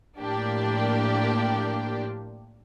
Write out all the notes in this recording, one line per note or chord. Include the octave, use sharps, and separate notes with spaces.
A2 F3 A#3 D4 G4